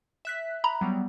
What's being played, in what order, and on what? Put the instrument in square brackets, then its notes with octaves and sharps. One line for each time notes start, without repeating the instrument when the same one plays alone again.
[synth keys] E5 F#6 B6
[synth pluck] A#5 B5
[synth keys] F#3 G3 B3